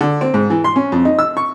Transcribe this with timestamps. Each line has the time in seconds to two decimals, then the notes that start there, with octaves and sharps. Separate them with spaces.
0.01 D3
0.21 C4
0.34 G#2
0.50 E3
0.64 C6
0.76 C#4
0.92 F2
1.05 D#4
1.19 E6
1.37 C#6